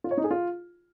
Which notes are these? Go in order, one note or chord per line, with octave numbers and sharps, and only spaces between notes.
F4
C#5
D#4
G#4
F4